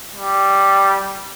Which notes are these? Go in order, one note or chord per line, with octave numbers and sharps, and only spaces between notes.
G3